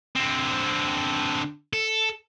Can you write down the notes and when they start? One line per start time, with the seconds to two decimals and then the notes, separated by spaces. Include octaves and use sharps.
0.16 D3 C4
1.73 A4